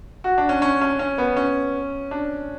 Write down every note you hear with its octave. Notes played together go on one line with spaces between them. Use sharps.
F#4
D4
C#4
C#4
C#4
C#4
B3
C#4
D4